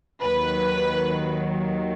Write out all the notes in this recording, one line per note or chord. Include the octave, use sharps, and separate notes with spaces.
D#2 D#3 F#3 B4